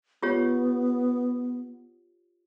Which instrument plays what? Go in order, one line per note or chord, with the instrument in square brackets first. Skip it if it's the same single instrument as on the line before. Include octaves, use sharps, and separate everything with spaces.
[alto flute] B3 [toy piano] F4 G4 C#5